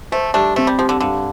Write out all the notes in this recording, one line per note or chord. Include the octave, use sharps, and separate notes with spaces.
A3 C5
G3 A3 D4
A3 C4
G3
F3 G4
D3
G2 D3